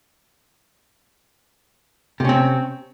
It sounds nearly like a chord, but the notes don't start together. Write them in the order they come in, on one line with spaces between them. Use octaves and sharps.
C3 C#4 C4